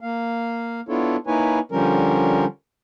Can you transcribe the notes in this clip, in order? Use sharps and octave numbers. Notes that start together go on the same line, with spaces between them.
A#3 F5
B3 D4 E4 F4 A4 C#5
A#3 D#4 E4 B4 C#5 G#5
D3 F3 G3 C#4 A#4